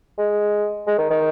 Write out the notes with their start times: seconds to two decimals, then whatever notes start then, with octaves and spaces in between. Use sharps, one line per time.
0.18 G#3
0.87 G#3
0.98 D#3
1.10 D#3